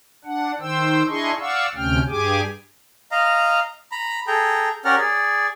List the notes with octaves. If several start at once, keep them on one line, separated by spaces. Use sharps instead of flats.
D4 F#5
D#3 C5 G5 E6
D4 E4 G#4 D#5 C6 C#6
D5 F5 F#5 C#6 E6
D2 C3 C#4 G5 F6
G2 G4 G#4 G#5 D6
D#5 F5 A#5
A#5 B5
G#4 A4 G5 A#5
C#4 G4 A#4 D5 F#5 F6
G#4 D5